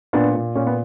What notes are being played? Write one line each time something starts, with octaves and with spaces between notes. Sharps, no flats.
A#2 B3 D4
A#2
A#2 C#4
B3